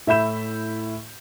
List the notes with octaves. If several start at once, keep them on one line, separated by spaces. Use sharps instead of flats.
A2 E4 E5 B5 G6 E7